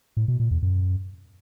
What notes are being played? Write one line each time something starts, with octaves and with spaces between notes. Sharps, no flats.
A2
B2
A#2
E2
F#2